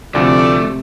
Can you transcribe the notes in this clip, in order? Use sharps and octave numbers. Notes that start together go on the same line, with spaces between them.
D2 C3 F3 A3 F4 D5